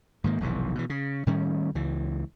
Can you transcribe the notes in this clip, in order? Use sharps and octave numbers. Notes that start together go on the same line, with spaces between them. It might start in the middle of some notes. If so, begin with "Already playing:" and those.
G#2 D#3 A#3
F1 B1 G2 E3
B2 E3
C#3
A2 D#3 G3 C#4
C#2 E3